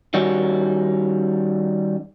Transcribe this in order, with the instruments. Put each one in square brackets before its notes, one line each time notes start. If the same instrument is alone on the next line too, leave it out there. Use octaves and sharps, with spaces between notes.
[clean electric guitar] D#3 G3 C#4 F#4